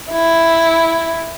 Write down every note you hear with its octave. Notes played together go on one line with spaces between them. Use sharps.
E4